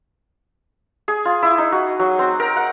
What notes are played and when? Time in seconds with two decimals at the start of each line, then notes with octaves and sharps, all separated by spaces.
1.08 G#4
1.25 F4
1.43 E4
1.58 D#4
1.72 F#4
1.99 F#3
2.19 C4
2.40 A#4
2.57 F#5